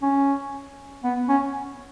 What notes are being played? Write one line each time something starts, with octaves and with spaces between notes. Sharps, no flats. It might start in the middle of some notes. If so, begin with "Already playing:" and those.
C#4
B3
C#4